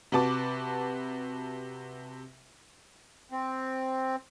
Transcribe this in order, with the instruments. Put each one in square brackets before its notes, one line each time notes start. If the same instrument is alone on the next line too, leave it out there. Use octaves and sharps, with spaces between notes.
[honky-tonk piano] C3 F#4 B4 A5 D6
[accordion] C4